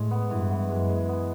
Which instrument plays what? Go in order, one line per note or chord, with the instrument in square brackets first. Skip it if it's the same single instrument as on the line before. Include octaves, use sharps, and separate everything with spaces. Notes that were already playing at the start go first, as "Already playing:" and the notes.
Already playing: [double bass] A2 [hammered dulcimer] G#3
[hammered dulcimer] B3
[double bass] G2 [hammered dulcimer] E3
[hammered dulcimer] B3
[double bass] F#2 [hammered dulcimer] G#3
[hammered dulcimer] G#3
B3